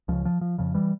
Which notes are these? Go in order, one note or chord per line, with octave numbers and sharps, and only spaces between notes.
C#2 C#3 F3
F3
F3
F2 C#3 F3
E3 G3